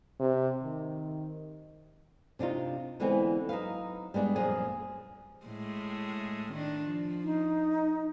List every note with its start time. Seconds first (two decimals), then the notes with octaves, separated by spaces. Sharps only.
0.20 C3
0.63 D#3
2.39 C3 D4 D#4 F4
3.00 D3 E3 G#3 B3 C4
3.49 F#3 D#4 B4 F5
4.14 G3 G#3 B3 D4
4.36 F#2 A#2 F3 F4 G#4 G#5
5.46 A2 G#3 A3
6.52 D#3 D4
6.85 F3
7.24 D#4